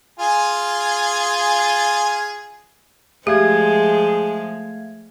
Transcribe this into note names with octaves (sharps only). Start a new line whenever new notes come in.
F4 G#4 G#5
F3 G#3 A3 G4 G#4 F5 G#6